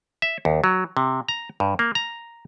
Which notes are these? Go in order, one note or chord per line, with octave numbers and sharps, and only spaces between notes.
E5
D#2
F#3
C3
A#5
G2
A#3
A#5